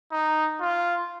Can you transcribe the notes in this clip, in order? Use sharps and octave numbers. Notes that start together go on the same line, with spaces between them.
D#4
F4